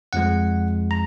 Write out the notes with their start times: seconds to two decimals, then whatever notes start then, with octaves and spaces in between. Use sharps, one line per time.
0.13 F2 F3 G#3 F#5
0.91 A#5